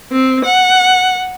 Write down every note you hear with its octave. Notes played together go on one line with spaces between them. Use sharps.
C4
F#5